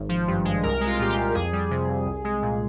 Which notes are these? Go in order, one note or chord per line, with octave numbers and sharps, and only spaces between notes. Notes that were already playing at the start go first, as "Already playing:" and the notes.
Already playing: G#1
F3
G2
G#3
C2 A#4
G#3
F4
A#2 G4
F4
C2
F2 G#4
G3
C3
F2
C2
G#3
A#2